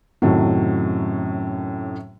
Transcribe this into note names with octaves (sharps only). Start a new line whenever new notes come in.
F#2 A2 C3 D#3 F#3